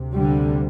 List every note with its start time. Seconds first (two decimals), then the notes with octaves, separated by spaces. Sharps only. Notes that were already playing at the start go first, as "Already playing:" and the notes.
Already playing: D2 C3
0.17 D3 G3